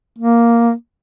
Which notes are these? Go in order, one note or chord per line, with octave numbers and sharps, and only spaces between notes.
A#3